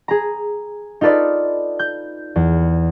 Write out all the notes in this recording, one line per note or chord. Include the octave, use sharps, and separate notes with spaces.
G#4 A#5
D#4 F4 A4 B4 D5
G6
E2